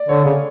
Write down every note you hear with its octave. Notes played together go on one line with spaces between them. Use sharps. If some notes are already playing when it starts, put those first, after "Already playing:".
Already playing: D5
D3 C#5
C#3